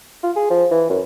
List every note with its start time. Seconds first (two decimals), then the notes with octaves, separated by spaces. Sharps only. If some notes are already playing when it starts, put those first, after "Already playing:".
0.23 F4
0.36 G#4
0.50 F3
0.71 E3
0.90 F#2